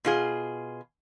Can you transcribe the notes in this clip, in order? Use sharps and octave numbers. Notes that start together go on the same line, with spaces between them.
B2 F4 G#4